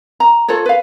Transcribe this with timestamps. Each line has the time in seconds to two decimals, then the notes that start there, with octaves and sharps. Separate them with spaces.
0.20 A#5
0.48 F4 A4 C5 C#5
0.66 B4 F5